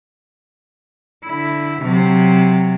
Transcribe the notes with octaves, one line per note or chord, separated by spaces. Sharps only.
D3 E4
C3 F#3